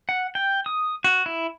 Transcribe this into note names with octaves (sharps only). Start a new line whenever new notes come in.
F#5
G5
D#6
F#4
E4